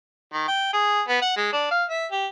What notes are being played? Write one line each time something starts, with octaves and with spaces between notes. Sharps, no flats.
D#3
G5
G#4
B3
F#5
G#3
D4
F5
E5
G4